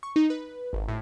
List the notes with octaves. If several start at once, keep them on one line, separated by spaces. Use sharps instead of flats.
C#6
D#4
B4
G#1
A2